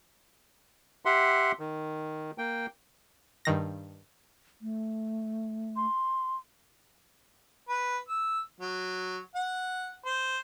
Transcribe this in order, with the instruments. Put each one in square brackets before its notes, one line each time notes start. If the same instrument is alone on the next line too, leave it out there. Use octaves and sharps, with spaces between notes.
[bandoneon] G4 E5 F#5 C6
D#3
A#3 G5
[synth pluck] G2 D#3 A#6
[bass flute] A3
[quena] C6
[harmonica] B4
E6
F#3
F#5
C5